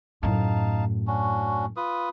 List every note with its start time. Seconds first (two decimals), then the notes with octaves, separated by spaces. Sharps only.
0.23 F#2 A2 D#4 F5 A5
1.07 C#4 D4 F#4
1.76 F4 B4 D#6